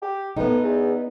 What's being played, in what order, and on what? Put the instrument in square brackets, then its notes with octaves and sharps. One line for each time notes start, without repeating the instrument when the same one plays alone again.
[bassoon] G4
[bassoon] A2 [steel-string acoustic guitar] B3 D#4
[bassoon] E2